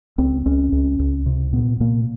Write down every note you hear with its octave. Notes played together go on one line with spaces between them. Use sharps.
C#2 C4
C#2 C#4
C#2
C#2
C3
A#2 B3
A#2 A#3